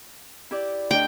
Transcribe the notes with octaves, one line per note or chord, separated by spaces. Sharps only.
E4 G4 D5
D2 D4 D#5 G5